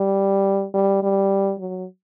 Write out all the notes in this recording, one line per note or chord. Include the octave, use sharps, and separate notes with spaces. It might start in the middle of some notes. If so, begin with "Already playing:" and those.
Already playing: G3
G3
G3
F#3